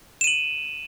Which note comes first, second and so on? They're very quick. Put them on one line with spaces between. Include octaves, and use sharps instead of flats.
E7 D#7 F#7